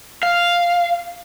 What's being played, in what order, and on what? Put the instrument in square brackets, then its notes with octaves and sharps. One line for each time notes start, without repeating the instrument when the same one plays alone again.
[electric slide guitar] F5